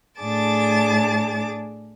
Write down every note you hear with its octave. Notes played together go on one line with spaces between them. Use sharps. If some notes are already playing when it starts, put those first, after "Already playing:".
A2 D4 G#4 A5 D6 A6